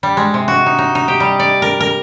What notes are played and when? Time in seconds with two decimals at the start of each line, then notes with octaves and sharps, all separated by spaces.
0.03 G3
0.17 G#3
0.34 C3
0.48 F#4
0.66 D#4
0.79 D#4
0.95 D#4
1.08 G4
1.20 G3
1.39 D5
1.62 A#4
1.80 A#4